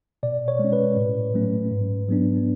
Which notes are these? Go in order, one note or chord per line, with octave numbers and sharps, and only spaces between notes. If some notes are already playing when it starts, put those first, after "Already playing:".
B2 D5
C#5
G#3
C#4
B4
A2
F#3 A3 C#4
G#2
F#3 B3 D4